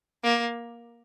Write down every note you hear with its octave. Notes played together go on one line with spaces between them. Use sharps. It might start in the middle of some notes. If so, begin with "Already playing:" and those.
A#3